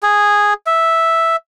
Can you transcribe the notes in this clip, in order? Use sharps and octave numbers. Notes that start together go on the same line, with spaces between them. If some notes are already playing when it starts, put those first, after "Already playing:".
G#4
E5